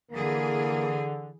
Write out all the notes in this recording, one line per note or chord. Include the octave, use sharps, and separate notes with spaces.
D3 E3 A#3 G#4